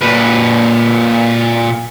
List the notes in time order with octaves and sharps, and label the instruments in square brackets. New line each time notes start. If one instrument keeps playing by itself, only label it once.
[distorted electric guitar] A#2 B4